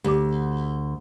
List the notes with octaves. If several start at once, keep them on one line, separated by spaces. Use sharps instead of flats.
D2 G4 D6